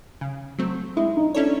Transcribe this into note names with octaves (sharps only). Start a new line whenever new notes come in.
C#3
F#3 A3 C4
G#3 E4
D#4
C#4 D4 E4 A4 C#5